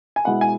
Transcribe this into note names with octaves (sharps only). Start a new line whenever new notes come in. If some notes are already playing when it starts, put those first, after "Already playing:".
G#5
B2 G#3 E4 F#5
G#5